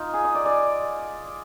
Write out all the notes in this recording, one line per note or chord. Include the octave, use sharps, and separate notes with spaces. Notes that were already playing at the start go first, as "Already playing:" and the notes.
Already playing: D#4 F4
G#4
D#5
D5
D5